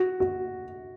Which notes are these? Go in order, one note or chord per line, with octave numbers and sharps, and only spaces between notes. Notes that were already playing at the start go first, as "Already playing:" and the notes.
Already playing: F#4
F#4